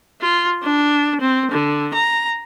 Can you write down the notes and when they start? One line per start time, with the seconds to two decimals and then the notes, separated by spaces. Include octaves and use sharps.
0.21 F4
0.63 D4
1.21 C4
1.51 D3
1.94 A#5